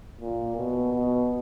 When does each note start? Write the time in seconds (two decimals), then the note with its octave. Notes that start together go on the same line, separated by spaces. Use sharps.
0.21 A#2
0.57 B2
0.93 B2